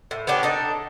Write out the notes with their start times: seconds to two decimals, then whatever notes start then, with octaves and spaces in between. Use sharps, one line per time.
0.11 A2
0.27 B3 C#4 D4 G4
0.43 D4 D#4 A4